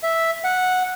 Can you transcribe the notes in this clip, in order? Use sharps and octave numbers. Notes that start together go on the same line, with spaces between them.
E5
F#5